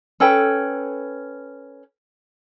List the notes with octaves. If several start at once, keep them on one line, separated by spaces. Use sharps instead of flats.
C#4 A4 B4 G5